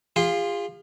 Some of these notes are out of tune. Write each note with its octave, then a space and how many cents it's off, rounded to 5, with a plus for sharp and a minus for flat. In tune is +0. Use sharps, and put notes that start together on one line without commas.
F4 +0 G#4 -40 C6 +0